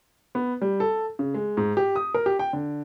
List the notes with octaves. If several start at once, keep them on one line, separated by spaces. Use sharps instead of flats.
B3
G3
A4
C#3
G#3
G#2
G4
D#6
A#4
G4
G5
D3